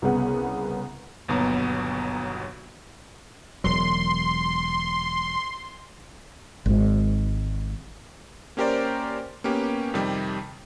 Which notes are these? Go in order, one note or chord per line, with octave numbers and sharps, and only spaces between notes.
C2 C#3 B3 F#5
G1 D#2 B2 F#3 B3 A#5
E1 F#3 C6
G#1 G#2
A#3 C#4 G4 A#4 C5 D5
A#3 B3 C#4 G4
F2 C3 D#3 G3